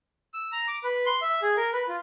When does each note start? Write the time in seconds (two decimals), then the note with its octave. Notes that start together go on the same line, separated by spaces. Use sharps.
0.34 E6
0.52 A#5
0.68 D6
0.84 B4
1.06 C6
1.22 E5
1.42 G#4
1.57 A#4
1.73 B4
1.88 F4